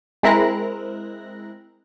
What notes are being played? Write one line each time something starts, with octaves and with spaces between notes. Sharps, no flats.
G#3 C4 E4 A#4 F#6 A#6